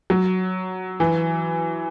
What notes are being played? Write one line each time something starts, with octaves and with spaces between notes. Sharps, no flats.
F#3
E3